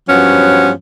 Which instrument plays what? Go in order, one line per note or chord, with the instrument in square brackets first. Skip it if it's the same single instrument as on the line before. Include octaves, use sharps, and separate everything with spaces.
[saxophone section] G2 F3 F#3 B3 C#4